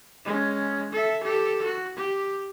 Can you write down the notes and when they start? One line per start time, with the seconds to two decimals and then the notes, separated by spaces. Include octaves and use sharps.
0.25 G#3 C#4
0.92 A4 E5
1.24 G4 A4
1.63 F#4
1.97 G4